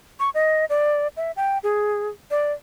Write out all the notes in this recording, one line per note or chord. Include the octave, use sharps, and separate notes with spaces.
C#6
D#5
D5
E5
G5
G#4
D5